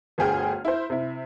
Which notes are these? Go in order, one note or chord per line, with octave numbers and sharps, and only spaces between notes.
G1 D2 G#4 G5 F6
E4 C5
C3 E4